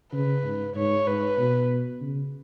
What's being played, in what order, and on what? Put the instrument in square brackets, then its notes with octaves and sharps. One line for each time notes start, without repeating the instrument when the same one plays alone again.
[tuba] C#3 [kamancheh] B4
[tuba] G#2
[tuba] G#2 [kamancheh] C#5
[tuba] G#2 [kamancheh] B4
[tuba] B2
C#3